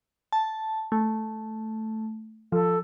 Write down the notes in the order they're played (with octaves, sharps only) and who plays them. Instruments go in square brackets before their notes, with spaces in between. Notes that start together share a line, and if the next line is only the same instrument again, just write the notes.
[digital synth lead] A5
A3
[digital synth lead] F3 [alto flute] A4